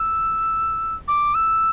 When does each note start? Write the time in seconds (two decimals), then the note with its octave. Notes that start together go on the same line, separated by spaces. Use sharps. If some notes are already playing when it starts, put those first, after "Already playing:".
Already playing: E6
1.08 D6
1.35 E6